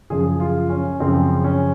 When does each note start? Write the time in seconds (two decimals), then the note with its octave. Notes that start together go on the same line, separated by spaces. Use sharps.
0.10 F#2 C#3 F3 G#4
0.40 F4
0.69 C#4
1.00 F#2 C#3 F3 C4
1.44 C#4